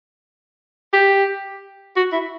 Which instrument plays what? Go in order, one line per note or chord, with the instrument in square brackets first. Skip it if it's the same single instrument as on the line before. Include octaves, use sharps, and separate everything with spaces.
[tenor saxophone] G4
F#4
E4